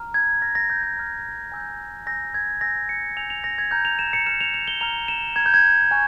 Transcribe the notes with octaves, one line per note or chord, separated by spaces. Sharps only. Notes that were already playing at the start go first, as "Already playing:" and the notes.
Already playing: A#5 F6
G#6
A#5 F6 A#6
A#6
G6
G#6
A#5 F6
G#5 E6 G6
G#5 E6 G6 A#6
G#6
G#5 E6 G6 A#6
C#7
G#5 E6 G6 F7
F7
A#6
G#6
A#5 F6 G6
F7
E7
C#7
A#5 F6 E7
F7
F7
G7
A#5 F6 F7
E7
A#5 F6 G#6
G6
G#6
G#5 C#6 F6